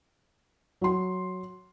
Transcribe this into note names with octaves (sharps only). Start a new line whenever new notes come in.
F#3 C6